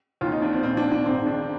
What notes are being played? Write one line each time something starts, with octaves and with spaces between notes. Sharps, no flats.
D#2 D#3 F4
D#4
D4
C4
A#1 A#2 C4
D4
D4
G#1 G#2 D#3 C4
D4